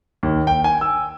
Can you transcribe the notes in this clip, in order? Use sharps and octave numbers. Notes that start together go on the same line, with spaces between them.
D#2
G5
G#5
E6